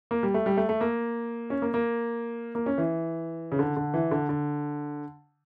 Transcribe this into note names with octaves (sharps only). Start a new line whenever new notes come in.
A#3
G3
A3
G3
A3
A3
A#3
C#4
A#3
A#3
A#3
C#4
E3
C#3
D3
D3
E3
D3
D3